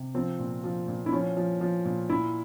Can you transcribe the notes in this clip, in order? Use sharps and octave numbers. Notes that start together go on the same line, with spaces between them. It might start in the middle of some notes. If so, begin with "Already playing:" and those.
Already playing: C3
F3 C4
A#2
F3
A#2
E4
F3 C#4
F3
F3
A#2
A#2 E4